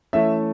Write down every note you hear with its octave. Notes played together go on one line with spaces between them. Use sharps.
E3 A3 C#4 E5